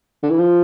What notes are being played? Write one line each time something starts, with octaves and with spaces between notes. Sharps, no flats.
D3
E3
F3